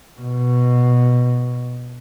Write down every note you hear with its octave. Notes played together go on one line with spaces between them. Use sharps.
B2